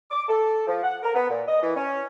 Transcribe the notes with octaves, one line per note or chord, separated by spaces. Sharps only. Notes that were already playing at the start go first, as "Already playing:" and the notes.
D6
A4
F3
F#5
A#4
B3
A#2
D#5
E3
C#4